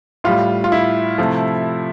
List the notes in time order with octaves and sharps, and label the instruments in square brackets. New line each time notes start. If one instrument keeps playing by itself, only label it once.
[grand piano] A2 G3 F4
F4
E4
C3 F3 A3